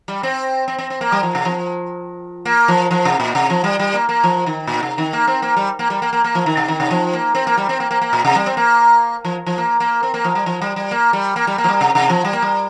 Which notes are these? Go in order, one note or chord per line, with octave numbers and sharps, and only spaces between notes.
G3
C4
C4
C4
C4
A#3
G3
F3
C3
F3
A#3
F3
F3
C3
A#2
C3
F3
G3
G3
A#3
A#3
F3
D#3
A#2
C3
D#3
A#3
C4
A#3
G3
A#3
G3
A#3
A#3
A#3
F3
D#3
C3
D#3
C3
F3
A#3
C4
A#3
G3
C4
A#3
A#3
A#3
A#2
C3
G3
C4
A#3
F3
F3
A#3
A#3
C4
A#3
F3
G3
F3
G3
G3
A#3
G3
A#3
G3
A#3
F3
G3
C3
C3
F3
G3
A#3
G3